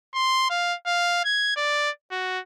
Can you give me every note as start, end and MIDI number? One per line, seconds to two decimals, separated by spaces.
0.15 0.50 84
0.50 0.75 77
0.87 1.23 77
1.25 1.54 92
1.56 1.90 74
2.11 2.39 66